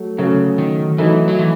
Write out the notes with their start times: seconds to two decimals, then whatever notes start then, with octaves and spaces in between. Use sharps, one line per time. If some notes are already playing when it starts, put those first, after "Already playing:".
Already playing: F#3 A3
0.18 C#3 F#3 A3 C#4
0.58 D#3
0.98 E3 F#3 A3 D#4
1.28 F#3
1.39 E3